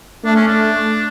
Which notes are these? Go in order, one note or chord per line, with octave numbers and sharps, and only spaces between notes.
A3 D4
C#4
D4